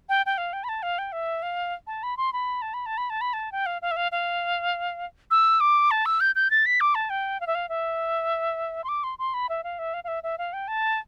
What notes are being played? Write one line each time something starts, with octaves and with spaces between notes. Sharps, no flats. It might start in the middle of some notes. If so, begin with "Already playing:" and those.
G5
G5
F5
G5
B5
A5
F5
G5
E5
F5
A5
B5
C6
B5
A5
B5
A5
B5
A5
B5
A5
G5
F5
F5
E5
F5
F5
E6
D6
A5
E6
G6
G6
A6
B6
D6
A5
G5
F5
E5
F5
E5
C6
D6
C6
C6
B5
E5
F5
E5
F5
F5
E5
E5
F5
G5
A5